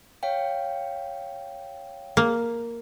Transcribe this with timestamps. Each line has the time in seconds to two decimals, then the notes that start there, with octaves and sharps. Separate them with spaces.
0.23 C#5 F5 G5
2.17 A#3